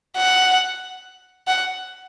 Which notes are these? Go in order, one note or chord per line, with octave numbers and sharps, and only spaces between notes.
F#5
F#5